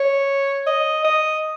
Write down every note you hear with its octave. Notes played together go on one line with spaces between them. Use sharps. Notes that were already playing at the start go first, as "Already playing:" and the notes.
Already playing: C#5
D#5
D#5